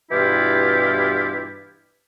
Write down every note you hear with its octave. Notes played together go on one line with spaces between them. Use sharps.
G2 B2 E3 E4 F4 G4